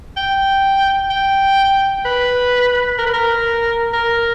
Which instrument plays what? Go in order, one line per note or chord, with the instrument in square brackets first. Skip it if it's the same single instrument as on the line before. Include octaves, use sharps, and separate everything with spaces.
[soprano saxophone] G5
G5
B4
A#4
B4
A#4
A#4